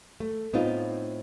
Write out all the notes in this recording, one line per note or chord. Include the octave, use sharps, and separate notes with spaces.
A3
A2 B3 C4 D#4 F4